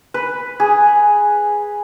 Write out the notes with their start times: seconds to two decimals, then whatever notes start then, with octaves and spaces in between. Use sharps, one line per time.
0.14 B4
0.60 G#4